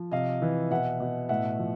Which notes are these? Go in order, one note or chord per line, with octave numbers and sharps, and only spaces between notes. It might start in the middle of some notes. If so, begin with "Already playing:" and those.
Already playing: F3
C3 D#5 F5
E3
B2 E5 F#5
B2
A2 E5 F#5
F3